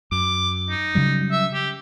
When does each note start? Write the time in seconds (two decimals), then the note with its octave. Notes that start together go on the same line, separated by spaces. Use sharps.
0.12 F#2 D6
0.70 D#4
0.95 C#3 F#3 G3
1.32 E5
1.54 G4